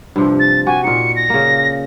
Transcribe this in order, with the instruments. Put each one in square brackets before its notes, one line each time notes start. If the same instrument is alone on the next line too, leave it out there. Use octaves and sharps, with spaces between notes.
[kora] G2 C3 F3
[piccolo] A6
[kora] F#4 G4 [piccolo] G#5
[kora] A#2 D#4 [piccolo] C#7
[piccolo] A#6
[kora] C#3 A#3